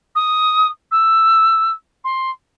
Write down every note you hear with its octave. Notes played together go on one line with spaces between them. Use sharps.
D#6
E6
C6